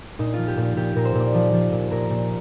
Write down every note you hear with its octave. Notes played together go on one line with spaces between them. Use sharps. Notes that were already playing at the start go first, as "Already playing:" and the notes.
A#2 D#4
F3 F4
G4
A#2
G4
A#2 G4
A#2 A#4
C5
A#2
D5
F3
F3
A#2
A#2 A#4
A#2